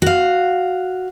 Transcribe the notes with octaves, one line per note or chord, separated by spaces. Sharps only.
F#4 F5